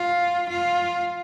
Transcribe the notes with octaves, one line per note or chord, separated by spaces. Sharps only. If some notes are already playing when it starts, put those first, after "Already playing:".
Already playing: F4
F4